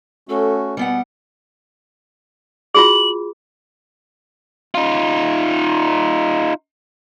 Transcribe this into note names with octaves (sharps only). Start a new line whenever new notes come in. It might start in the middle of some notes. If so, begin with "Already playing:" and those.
A3 C#4 F#4 A4
B2 G3 B3 F#5 G#5
F4 F#4 G#4 F#7
D#4 F4